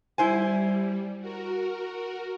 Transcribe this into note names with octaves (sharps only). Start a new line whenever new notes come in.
G3 E4 C5 G#5
F#4 A#4